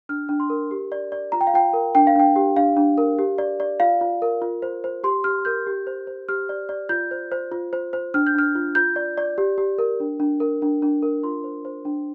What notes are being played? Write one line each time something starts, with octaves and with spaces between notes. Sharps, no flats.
D4 F6
D4
C6
A#4
G4
D5
D5
F4 A#5
G5
F5
F4 G5
A#4
D4 G5
F5
D4 G5
G4
D4 F5
D4
A#4
G4
D5
D5
F4 F5
F4
A#4
F4
C5
C5
G4 C6
G4 F6
A#4 G6
G4
C5
C5
G4 F6
D5
D5
F4 G6
C5
C5
F4
C5
C5
D4 F6
G6
D4 F6
F4
F4 G6
D5
D5
G4
G4
A#4
D4
D4
A#4
D4
D4
A#4
F4 C6
C5
C5
D4